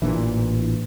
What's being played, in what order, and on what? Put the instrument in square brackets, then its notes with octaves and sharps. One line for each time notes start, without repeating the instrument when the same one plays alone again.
[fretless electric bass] A1 A#2 E3 [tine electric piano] D4 E4